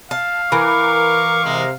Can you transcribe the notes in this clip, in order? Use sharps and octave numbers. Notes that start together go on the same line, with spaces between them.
F5 A5
E3 A#4 C#6 D6
C3 G#3 A#4